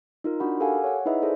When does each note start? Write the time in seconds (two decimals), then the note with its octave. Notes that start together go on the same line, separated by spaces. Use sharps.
0.24 D#4 F4 A#4
0.40 D4 D#4 F#4 F#5 B5
0.60 G4 A4 A#4 F5 F#5 G#5
0.84 C#5 F#5
1.06 D#4 E4 G#4 B4 D#5 E5
1.22 G#4 A4 C5 D5